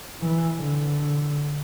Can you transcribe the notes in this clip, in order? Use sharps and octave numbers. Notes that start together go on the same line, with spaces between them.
E3
D3